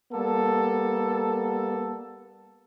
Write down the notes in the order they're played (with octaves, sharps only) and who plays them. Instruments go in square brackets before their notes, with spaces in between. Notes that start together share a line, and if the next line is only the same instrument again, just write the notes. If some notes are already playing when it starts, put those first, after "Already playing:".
[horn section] G3 A#3 B3 A4